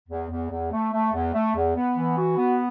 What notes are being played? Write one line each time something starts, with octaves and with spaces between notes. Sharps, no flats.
E2
E2
E2
A3
A3
E2
A3
E2
B3
E3
F#4
B3